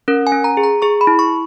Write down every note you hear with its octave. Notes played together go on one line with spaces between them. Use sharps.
C#4 A#4
G#5
C#4
A#5
G#4
A#5
G#4 C#6
B5
E4
C#6